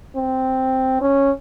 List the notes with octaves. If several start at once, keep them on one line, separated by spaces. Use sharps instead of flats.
C4
C#4